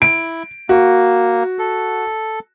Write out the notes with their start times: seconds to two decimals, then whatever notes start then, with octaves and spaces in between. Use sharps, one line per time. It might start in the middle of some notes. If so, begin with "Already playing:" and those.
0.02 E4 D7
0.69 A#3 F#4
1.59 A4